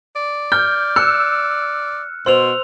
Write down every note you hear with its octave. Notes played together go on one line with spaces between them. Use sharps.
D5
F6 G6
E6 F#6 C#7
B2 C5 C6 E6 F7